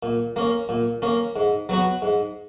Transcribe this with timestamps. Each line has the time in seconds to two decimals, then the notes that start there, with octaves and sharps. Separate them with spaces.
0.03 A#2
0.36 A#3 C#4
0.69 A#2
1.02 A#3 C#4
1.36 G#2
1.69 F#3 B3 F#4
2.02 G#2